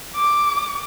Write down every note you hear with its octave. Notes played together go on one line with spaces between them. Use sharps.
D6